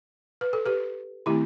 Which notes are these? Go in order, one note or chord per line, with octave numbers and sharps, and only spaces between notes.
B4
A4
G4 B4
D#3 A3 C4 E4 G4